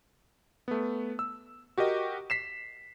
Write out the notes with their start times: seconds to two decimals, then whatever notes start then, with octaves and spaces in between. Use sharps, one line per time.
0.68 A3 B3
1.19 E6
1.78 F#4 G4 A#4 D#5
2.30 B6 C7 E7